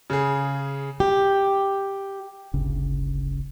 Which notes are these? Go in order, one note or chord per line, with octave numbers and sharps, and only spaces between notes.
C#3 G#4
G4
D1 G1 C#3